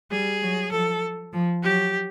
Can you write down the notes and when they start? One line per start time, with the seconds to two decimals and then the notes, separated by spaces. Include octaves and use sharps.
0.11 G3 G#4
0.42 F#3
0.71 F3 A4
1.33 F3
1.63 F#3 G4